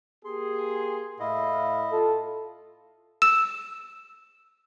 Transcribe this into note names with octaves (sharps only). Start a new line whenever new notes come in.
A#3 G4 G#4 C6
A2 E4 D#5 F5
F4 A4
E6 E7